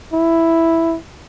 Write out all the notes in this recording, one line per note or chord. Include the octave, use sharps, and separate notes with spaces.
E4